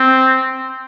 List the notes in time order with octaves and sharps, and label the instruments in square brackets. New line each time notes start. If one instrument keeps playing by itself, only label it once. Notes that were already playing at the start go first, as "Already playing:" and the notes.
Already playing: [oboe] C4